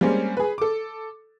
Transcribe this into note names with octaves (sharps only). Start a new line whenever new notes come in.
G3 G#3 A#3 C4 C#4
G#4 B4
A4 D6